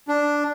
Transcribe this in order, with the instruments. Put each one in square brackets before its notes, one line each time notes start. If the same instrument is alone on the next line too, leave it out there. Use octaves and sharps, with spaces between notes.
[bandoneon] D4